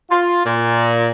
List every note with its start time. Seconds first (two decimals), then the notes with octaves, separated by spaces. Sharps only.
0.10 F4
0.45 A#2